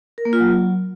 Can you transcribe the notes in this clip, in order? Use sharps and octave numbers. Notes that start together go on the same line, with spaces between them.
A#4
A#3
F4
F#3